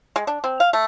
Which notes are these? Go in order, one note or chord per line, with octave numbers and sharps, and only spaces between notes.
G#3
D4
C4
F5
A3